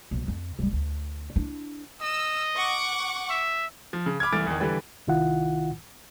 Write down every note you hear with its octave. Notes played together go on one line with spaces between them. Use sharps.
B1 F#3
F2
D#1 G3
D2
D4 E4
D#5 E6
F#5 C#6 D6
E5
F3
C#3
B5 D6 F6 G#6
C2 E3 A3 F6 A6 D7
E2 D#3
D3 E3 G3 B4
C2 D#3 E4 F4 F#5